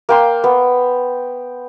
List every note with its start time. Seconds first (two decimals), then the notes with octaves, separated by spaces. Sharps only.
0.09 A#3 G5 C6
0.44 B3